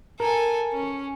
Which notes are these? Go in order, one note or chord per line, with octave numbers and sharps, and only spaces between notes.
A4 A#4 G#5
C#4